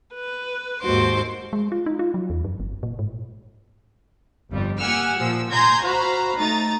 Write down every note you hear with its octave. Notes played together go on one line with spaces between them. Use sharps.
B4
D#2 G#2 F#4 C5 C6 D6
G#3
F4
D#4
F4
F#3
E2
F#2
G1
A#2
G#2
G1 F2 G3
A#3 G4 F#5 G#5 E6 F6
A#2 F3 E6
G#5 A#5 C6 G6 G#6 A#6
F#4 C5 F5 A#5 B5
A3 D#4 A#5 A6